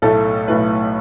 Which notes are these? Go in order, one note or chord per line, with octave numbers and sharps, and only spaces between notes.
B1 A2 A3 A4
B1 A2 A3 B4